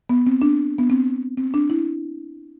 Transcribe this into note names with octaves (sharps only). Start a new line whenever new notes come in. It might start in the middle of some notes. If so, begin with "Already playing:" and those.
B3
C4
D4
B3
C4
C4
D4
E4